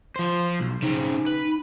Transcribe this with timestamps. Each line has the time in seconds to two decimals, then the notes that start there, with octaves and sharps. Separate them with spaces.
0.16 F3 C5
0.60 B1
0.82 C#3 C4 D#4
1.26 B4